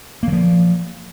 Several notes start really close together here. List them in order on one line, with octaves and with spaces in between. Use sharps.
A#3 E3 F3